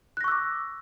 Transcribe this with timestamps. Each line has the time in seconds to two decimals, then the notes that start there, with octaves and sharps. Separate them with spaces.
0.17 F#6
0.21 A#6
0.24 C#6
0.28 E6
0.31 D6